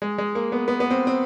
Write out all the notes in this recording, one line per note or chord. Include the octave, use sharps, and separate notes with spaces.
G#3
G#3
A#3
B3
B3
B3
C4
C4